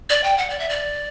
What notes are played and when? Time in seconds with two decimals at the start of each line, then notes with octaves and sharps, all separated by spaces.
0.10 D5
0.24 G5
0.38 F#5
0.50 D5
0.59 E5
0.69 D5